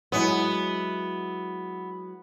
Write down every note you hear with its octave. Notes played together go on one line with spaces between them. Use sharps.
F#3 G#3 B3 E4